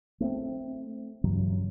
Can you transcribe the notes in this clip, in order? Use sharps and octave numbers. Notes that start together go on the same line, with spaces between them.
A3 B3 C4
G2 C#3 E3 F#3